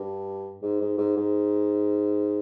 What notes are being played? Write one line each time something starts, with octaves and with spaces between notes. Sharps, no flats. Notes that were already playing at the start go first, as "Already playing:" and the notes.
Already playing: G2
G#2
G#2
G#2
G#2